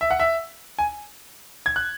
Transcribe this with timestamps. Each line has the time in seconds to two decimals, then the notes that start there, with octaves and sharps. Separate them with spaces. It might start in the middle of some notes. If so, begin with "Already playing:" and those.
0.01 E5
0.11 F#5
0.20 E5
0.79 G#5
1.66 G#6
1.76 F#6